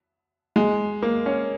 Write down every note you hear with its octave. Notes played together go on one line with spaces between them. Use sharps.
G#3
A#3
C#4